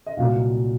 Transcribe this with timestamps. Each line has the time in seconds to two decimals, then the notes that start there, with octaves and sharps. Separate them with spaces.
0.06 D#5
0.17 C2 A#2 F#3 F5